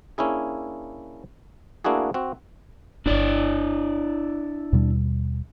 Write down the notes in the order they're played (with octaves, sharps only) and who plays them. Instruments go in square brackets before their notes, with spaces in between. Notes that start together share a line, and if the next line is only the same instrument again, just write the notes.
[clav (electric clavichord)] A#3 C#4 D4 E4 G#4
A3 A#3 D4 E4 F#4 G#4
C4 F#4
[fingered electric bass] D1 G1 [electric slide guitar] D4 E4 D5
[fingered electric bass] D#2 B2 G3